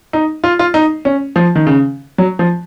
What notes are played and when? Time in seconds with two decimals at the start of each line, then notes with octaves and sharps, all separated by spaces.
0.13 D#4
0.44 F4
0.59 F4
0.74 D#4
1.05 C#4
1.36 F3
1.56 D#3
1.67 C#3
2.18 F#3
2.39 F3